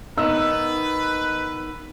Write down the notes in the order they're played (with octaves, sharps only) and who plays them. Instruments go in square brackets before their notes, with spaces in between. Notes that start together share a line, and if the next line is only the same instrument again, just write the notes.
[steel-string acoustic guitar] D#3 B3 [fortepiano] D#4 [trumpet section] B4 [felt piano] E6